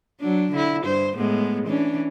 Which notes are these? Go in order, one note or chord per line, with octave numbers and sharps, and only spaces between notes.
F#3 D4
D3 E4
G2 C5
A2 G#3 B3
E3 C#4 D4